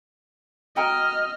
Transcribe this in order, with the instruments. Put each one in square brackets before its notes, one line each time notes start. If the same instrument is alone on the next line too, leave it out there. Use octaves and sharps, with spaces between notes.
[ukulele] F#4 G5 A#5 [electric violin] D#5 F6